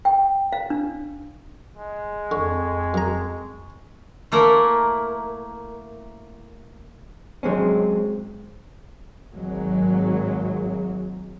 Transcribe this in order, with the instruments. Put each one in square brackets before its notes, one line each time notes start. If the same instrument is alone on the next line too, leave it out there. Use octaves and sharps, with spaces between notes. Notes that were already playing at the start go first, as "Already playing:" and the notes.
[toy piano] G5
F5
D4
[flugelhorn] G#3
[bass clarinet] F2 [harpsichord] D3 [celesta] C#6
[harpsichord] F#2 A#5
[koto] A3 A#3 E4 A#4
[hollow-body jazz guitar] F#3 G#3 C4 C#4
[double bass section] G#1 F#3 G#3 A#3